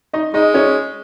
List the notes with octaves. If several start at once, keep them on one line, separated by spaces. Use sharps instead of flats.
D#4 D#5
G#3 D#4 D#5
C#4 C#5